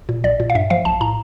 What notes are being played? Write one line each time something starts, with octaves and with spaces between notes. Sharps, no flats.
A#2
A#1 D5
A#2
F5
G2 E5
F3 F5
A#1 A5
A2 A#5